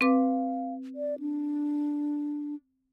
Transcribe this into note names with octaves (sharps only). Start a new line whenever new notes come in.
C4 B4 F5 D6
D5
D4